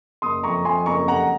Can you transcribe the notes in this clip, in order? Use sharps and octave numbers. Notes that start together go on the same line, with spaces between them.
F#1 C6 D#6
F2 A#5 C#6
F2 G#5 C6
F#1 A#5 C#6
F1 F#5 A#5